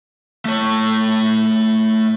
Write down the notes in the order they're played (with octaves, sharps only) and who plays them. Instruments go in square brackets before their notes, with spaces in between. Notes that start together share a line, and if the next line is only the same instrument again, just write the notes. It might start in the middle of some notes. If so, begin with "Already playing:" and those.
[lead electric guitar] A3 C#5